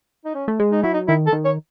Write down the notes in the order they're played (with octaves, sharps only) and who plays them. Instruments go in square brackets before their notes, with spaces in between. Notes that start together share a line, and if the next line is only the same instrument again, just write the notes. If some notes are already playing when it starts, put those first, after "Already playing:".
[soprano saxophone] D#4
C#4
[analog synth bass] A3
G#3
[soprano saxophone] D#4
[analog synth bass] F#3 [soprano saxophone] E4
[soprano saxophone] D#4
[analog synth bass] D#3 [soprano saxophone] E4
[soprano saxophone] A4
[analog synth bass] D#3
[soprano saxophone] C#5